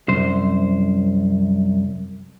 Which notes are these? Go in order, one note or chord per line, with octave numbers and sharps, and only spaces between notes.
C2 F#2 C5